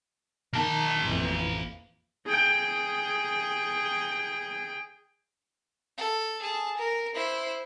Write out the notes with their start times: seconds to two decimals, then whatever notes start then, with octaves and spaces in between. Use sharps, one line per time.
0.54 D#3 A#3 A5
1.04 A1 F2 E3
2.25 G#4 G5
5.97 A4
6.42 G#4 A5
6.77 A#4
7.15 E4 C5